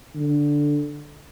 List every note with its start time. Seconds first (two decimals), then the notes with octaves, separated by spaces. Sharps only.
0.15 D3